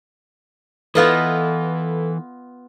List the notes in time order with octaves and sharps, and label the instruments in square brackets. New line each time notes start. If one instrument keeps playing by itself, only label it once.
[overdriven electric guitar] E3 [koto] B3 F4 D#5 [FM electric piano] A4 B4